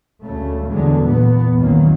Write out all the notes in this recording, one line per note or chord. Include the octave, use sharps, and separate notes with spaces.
D2 C#3 A3
E2 D3 F#3 G#3
E2 A#2 E3 B3
C2 F#2 D#3 F#3 A#3